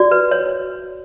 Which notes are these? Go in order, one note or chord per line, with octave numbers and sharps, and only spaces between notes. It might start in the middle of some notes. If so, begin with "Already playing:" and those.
Already playing: F#4 D5
B4
C#5